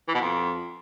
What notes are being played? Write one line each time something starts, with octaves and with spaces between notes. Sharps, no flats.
E3
B2
F2